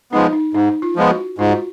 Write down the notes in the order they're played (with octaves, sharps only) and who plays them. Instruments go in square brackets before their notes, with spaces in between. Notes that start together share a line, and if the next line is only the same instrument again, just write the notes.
[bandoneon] F3 G#3 B3 [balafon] D#4
[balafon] D#4
[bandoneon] G#2 [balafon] D#4
[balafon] F4
[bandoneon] F3 G#3 B3
[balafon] F#4
[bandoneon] G#2 [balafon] F4
[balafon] F#4